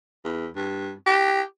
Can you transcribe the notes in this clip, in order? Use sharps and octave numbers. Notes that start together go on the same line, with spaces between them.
E2
G2
G4